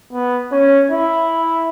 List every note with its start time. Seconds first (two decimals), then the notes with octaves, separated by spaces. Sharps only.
0.13 B3
0.52 C#4
0.91 E4